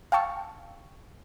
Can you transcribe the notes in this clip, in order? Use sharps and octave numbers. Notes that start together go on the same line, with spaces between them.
F5 G5 A5 C#6 E6